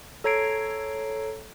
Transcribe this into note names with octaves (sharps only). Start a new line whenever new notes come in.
A4 C#5 A#5 G#6 C7 D7